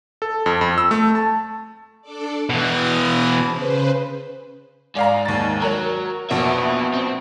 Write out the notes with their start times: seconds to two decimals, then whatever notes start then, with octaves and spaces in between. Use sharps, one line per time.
0.22 A4
0.46 F2
0.61 F2
0.78 E6
0.91 A3
1.15 A5
2.02 D4 A4 D5
2.49 B2 E3 D#6 F6
3.44 C#3 B4 C5
4.96 G#2 D5 F5 A#5
5.25 D#2 A6
5.62 F#3 A#4 C#5
6.30 A#1 F2 B2 B4 E5
6.94 C4